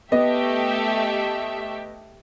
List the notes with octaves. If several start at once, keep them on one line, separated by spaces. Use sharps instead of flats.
A3 B3 G4 D#5 E5